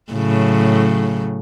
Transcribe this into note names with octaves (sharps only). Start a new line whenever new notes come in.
A2 C#3 F#3